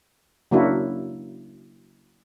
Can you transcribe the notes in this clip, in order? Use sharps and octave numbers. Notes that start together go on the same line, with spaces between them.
C#3 F#3 A#3 D4 E4 F#4